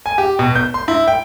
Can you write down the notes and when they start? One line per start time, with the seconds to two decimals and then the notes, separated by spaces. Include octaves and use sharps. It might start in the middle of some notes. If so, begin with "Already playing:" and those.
0.06 G#5
0.18 G4
0.39 B2
0.55 G6
0.74 C6
0.88 E4
1.08 G5